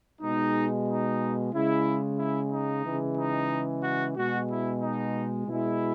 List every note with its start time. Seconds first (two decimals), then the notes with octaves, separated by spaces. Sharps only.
0.21 B2 G#3 D#4
0.87 D#4
1.53 C#3 G#3 E4
2.18 E4
2.52 D#4
2.85 C#3 E3 G#3
3.16 D#4
3.83 F#4
4.16 B2 G#3 F#4
4.49 E4
4.81 D#4
5.47 B2 G#3 E4